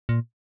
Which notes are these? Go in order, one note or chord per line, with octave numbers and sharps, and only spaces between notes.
A#2